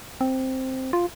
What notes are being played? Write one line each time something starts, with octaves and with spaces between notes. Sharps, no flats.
C4
F4